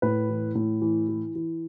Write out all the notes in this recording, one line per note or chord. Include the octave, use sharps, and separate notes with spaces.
A2 B4
E3
A2
E3
E3
E3